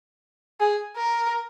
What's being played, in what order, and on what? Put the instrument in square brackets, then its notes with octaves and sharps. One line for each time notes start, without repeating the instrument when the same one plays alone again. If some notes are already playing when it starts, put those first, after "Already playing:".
[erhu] G#4
A#4